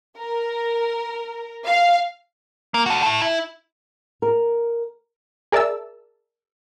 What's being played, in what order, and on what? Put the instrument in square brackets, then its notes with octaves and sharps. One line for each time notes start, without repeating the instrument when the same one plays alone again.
[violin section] A#4
F5
[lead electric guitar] A#3
F#4 A4
E4 A4
E4
[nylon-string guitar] A#4
[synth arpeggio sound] G#4 A#4 D5 E5 A5 E6